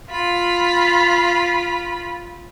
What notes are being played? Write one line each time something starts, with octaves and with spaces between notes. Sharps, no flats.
F4 B5